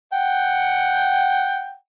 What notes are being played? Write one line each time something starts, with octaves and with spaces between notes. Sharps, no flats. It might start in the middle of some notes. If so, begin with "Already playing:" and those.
F#5 G5